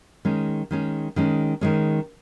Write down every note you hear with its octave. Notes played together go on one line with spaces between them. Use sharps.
D#3 G#3 C#4
D#3 G#3 C#4
D#3 G#3 C#4
D#3 G#3 C#4